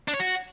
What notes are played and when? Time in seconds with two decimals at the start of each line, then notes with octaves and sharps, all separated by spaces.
0.08 D4
0.14 C#5
0.20 F#4